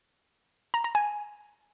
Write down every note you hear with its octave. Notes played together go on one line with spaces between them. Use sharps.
A#5
A#5
G#5